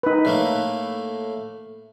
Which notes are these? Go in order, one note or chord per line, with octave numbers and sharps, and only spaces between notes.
D#4 B4
A2 A3 A#3